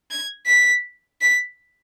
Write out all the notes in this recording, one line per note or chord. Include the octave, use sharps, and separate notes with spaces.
G#6
B6
B6